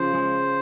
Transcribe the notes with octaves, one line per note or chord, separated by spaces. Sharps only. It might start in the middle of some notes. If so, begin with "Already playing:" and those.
Already playing: C#3 F3 C5
G#3